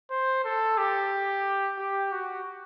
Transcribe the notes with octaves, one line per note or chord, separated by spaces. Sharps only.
C5
A4
G4
G4
F#4